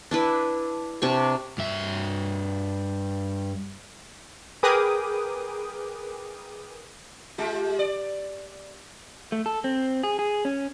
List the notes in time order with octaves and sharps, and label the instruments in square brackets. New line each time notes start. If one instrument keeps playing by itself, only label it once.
[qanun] D4 E4 B4
C3 D4 C#6
[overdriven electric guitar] G2 E5
[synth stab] G#4 A#4 B4 G5 D6 D#6
[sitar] G#3 F4 G4
D5
[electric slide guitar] A3
A4
C4
G#4
G#4
C#4